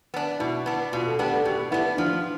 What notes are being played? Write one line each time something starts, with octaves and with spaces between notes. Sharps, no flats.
B3 D4
B2 E4
B3 D4
B2 F4
A4
B3 D4 G4
A4
B2 G4
B3 D4 E4
F3 D4